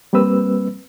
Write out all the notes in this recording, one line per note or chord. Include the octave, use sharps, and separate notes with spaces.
G3 A#3 C4 B4 E6